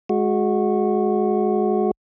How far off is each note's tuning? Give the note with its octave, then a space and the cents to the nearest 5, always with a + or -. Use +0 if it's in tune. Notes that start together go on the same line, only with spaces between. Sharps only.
G#3 +15 F#4 -15